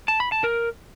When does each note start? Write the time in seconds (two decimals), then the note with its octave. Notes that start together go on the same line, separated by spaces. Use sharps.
0.08 A5
0.20 B5
0.32 A5
0.44 A#4